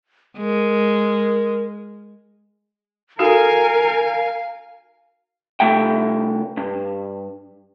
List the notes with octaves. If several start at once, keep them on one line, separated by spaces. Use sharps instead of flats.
G#3 A#4
D#4 F#4 A4 A#4 F5 G#5
C2 F2 C3 A3 E5 G5
G2